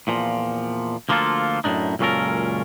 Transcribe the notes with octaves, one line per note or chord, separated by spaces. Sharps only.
E2 A#2 F3
D2 F3 A#3 D#4 F4 A4
F#2 A2 C3 D4 D#4
C#2 F#2 A#2 C#4 A4 A#4